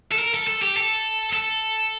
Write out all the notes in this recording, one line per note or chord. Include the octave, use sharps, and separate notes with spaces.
A4
A#4
A4
A4
G4
A4
A4